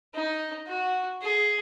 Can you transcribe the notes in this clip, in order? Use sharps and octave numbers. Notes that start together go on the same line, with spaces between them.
D#4
F#4
G#4